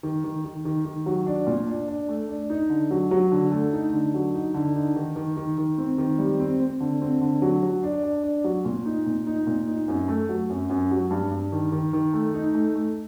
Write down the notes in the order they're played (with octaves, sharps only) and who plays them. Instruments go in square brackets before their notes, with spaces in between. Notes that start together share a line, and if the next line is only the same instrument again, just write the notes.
[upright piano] D#3
D#3
D#3
D#3
D#3
F#3
D4
A#2
D4
D4
A3
D4
D#4
D3
F#3
F#3
D3
A3
D#4
D3
F#3
D#4
D3
D#4
D#3
D#3
D#3
D#3
C4
D#3
G3
C4
C4
D3
C4
D3
F#3
F#3
D4
D4
D4
F#3
A#2
D#4
A#2
D#4
A#2
D#4
F#2
A3
F#3
F#2
F#2
F#3
G2
G2
D#3
D#3
D#3
A3
D#4
A3
A3